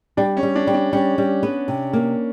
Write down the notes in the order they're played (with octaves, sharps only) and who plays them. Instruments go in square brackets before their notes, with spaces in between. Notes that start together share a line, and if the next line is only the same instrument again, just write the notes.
[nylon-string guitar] G3 [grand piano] D4
[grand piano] C#4
[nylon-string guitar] G3
[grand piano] D4
[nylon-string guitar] G3
[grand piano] D4
[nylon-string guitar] G3 [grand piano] C#4
[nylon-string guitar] G3
B3
C3
A#3